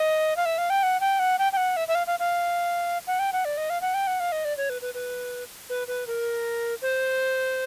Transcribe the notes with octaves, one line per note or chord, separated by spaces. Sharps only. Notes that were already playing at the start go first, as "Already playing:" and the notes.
Already playing: D#5
F5
E5
F5
G5
F#5
G5
F#5
G5
G5
F#5
E5
E5
F5
F5
F5
F#5
G5
F#5
D5
D#5
F5
F#5
G5
F#5
F5
D#5
D5
C#5
B4
B4
B4
B4
B4
A#4
C5